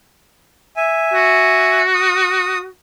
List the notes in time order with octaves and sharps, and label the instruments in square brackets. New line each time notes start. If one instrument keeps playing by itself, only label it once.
[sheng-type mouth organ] E5 G#5
[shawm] F#4
[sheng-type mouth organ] D#6